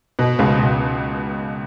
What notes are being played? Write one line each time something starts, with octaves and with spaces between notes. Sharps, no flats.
B2
C#2 C#3
B2